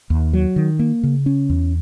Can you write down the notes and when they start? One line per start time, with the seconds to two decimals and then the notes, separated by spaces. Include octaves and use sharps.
0.10 D#2
0.33 F#3
0.56 D#3
0.79 A#3
1.03 C#3
1.26 C#4
1.50 E2